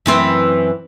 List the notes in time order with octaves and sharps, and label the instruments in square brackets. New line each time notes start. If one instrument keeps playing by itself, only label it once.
[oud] F#2 E3 C4